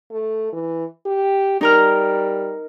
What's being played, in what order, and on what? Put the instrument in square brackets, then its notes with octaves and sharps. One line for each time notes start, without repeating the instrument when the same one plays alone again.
[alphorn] A3
E3
G4
[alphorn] G3 [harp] D#4 A#4 F6